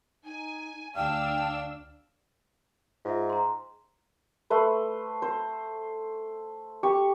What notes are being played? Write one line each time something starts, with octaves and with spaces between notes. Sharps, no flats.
D#4 G#5
D2 D4 F5 G5 E6
G#2 F4 E5
A#5 C6
A3 B4 C5
C5
G4 C#6